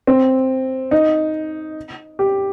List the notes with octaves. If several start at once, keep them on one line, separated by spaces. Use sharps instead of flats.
C4
D#4
G4